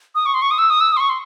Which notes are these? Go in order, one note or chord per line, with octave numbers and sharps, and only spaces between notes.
D#6
C#6
C6
C#6
D#6
E6
D#6
E6
D#6
C6
C#6
C6